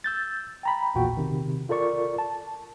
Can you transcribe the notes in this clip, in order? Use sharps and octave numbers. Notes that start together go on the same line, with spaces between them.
E6 G6 A6
G5 A#5 B5
A#1 E2 A#2 F#4 G5
C3 D#3
F4 A4 A#4 D5 C#6
A5